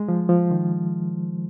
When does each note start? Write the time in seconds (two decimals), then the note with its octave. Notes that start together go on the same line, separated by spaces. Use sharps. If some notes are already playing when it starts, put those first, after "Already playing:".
Already playing: G#3
0.08 F3
0.29 F3
0.51 D#3